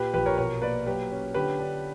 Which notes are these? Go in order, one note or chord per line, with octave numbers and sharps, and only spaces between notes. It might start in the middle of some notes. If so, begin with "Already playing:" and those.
Already playing: A#2 G4 B4
A#1 G4 B4
A#4 C#5
B2 A#4 C#5
A#3 B4 D5
F#3 G4 B4
C#4
D3 G4 B4
D4